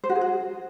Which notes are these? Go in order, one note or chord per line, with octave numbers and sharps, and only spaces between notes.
C5
F#4
G#4
F#4